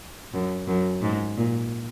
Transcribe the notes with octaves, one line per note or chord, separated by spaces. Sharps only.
F#2
F#2
G#2
A#2